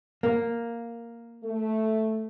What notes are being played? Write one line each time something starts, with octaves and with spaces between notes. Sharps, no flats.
A#3
A3